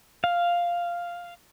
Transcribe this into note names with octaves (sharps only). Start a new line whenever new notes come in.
F5